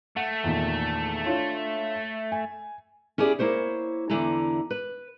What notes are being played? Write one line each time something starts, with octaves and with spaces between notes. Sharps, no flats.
A3 F#5
E2 A#2 D#3
D4 F4 C#5
G#5
C#4 E4 G4 G#4 D5
A#3 E4 C5 C#5
E2 D3 E4 G#5 A#5
B4